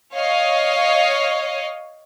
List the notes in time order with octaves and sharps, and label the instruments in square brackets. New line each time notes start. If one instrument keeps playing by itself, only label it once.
[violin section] C#5 D#5 F5